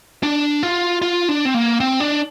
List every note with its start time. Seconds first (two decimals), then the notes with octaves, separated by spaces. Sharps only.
0.23 D4
0.63 F4
1.02 F4
1.28 D4
1.45 C4
1.54 A#3
1.80 C4
2.00 D4